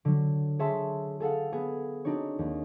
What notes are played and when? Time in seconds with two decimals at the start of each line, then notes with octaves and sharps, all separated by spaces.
0.05 D3 F#3
0.59 G#4 C#5 E5 A5 C6
1.20 G#4 A4 F5 F#5
1.52 B3 G#4
2.05 C4 D4 D#4 F#4 C#5
2.39 D#2